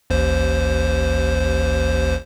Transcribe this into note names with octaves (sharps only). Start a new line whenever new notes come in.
A1 D#2 C5